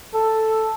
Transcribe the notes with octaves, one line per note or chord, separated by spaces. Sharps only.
A4